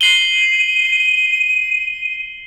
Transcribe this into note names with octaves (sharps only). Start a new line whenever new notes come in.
C7 D#7 F#7 G7